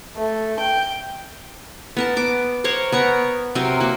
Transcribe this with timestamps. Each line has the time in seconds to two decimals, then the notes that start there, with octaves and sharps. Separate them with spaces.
0.16 A3
0.59 G5
1.97 B3 A#4 A5
2.16 B3 D6
2.64 A#4 C5 C#5 F#5
2.92 B3 A#4 C#5 A#5
3.55 C3 F#3 C4 A#4
3.80 A#3 F#4